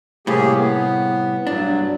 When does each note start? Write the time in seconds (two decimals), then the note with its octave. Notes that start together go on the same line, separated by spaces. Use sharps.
0.27 C2 A2 A#3 G4 G#4
0.57 B3
1.47 G2 F#3 D4